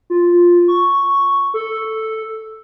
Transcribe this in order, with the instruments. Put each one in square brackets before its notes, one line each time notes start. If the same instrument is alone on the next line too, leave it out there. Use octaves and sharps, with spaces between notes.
[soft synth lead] F4
C#6
A4